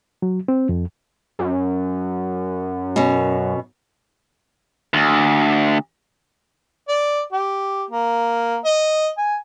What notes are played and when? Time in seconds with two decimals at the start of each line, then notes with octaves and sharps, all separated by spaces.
0.22 F#3
0.48 C4
0.69 F2
1.39 F#2
2.96 B2 C#4
4.94 D2
6.88 D5
7.33 G4
7.90 A#3
8.65 D#5
9.18 G#5